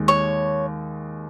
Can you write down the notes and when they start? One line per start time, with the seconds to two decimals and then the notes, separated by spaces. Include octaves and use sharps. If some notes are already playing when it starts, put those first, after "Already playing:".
Already playing: D#2 D#3 G#3
0.08 C#5